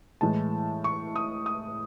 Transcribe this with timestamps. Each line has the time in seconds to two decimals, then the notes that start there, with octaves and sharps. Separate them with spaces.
0.21 A2 E3 G#3 A5
0.84 C#6
1.16 D#6
1.46 D#6